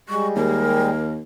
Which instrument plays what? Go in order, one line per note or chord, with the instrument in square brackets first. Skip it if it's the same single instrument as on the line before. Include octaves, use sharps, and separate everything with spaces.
[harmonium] G3 G#3 [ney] C#6
[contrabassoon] D#2 [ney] A#4